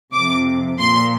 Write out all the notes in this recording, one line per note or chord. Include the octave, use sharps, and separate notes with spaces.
F2 C3 F3 D6
A#2 F3 C6